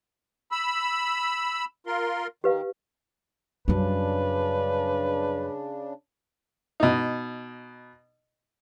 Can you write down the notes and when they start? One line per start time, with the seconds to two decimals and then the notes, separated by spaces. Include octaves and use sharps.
0.52 B5 E6
1.87 F4 A#4 C6
2.44 D#3 G4 B4 F5
3.68 F#2 C#3 G3 D4 B4
6.80 B2 D#4